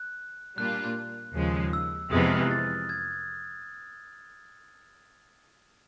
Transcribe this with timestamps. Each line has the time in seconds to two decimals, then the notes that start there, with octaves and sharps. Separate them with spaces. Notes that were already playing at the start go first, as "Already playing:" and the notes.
Already playing: F#6
0.57 A#2 G3 A#3 D4 F4 F#6
1.35 D#2 C#3 F3 G#3
1.73 E6
2.12 F2 C3 E3 G#3 B3 D#6
2.31 F6
2.41 F#6
2.51 A6
2.89 G#6